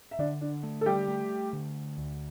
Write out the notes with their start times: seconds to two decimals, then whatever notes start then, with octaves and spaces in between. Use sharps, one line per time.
0.11 E5
0.19 D3 D4 D5
0.41 D4
0.63 A3
0.81 A4
0.86 G3 G4
1.08 A3
1.53 D3
1.98 D2